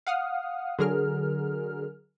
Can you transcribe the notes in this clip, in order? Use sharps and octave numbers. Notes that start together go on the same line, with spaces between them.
F5 F#5 D#6 F6
D3 F#3 G#4 A#4 F6